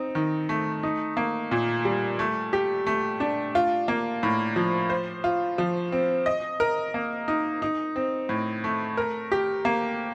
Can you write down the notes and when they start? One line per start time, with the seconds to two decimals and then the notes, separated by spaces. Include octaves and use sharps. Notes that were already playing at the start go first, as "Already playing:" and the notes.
Already playing: C4 D#4
0.15 D#3
0.49 A3
0.83 D#4
1.17 A#3
1.51 A#2
1.85 G3
2.19 A3
2.53 G4
2.87 A3
3.20 D4
3.55 F4
3.88 A#3
4.23 A2
4.56 F3
4.90 C5
5.24 F4
5.58 F3
5.92 C4
6.26 D#5
6.60 A#4
6.94 A#3
7.28 D#4
7.62 D#4
7.96 C4
8.29 A2
8.64 A3
8.97 A#4
9.32 G4
9.65 A#3